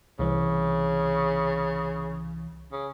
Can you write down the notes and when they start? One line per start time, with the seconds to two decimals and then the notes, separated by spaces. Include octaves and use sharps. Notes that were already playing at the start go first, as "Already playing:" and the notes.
0.19 C2 C#3 E3
2.72 C#3